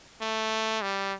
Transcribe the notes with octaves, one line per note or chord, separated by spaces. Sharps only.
A3
G3